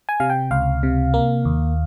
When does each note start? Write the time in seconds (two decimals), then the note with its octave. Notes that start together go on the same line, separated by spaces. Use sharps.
0.09 G#5
0.20 C3 F5
0.30 G5
0.51 C#2 F5
0.83 C3
1.14 A#3
1.45 D#2